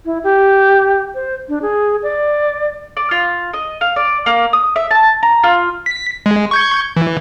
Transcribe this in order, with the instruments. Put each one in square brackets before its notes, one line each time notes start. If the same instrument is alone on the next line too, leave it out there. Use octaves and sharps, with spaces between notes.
[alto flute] E4
G4
C5
D4
G#4
D5
[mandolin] D5
F4
D#5
F5
D5
A#3
D#6
E5
A5
A#5
F4
[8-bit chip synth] B6
G#3
C#6 G6 G#6
E3